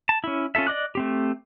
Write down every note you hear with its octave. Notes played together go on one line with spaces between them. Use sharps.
A5
C#4 E4
C#4 F4 A4 E5
D5 D#5 D6 F#6
A3 C4 G4